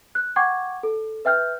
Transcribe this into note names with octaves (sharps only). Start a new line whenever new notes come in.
F#6
F#5 G5 C#6 D6 G#6
A4
B4 E5 G5 F6 G6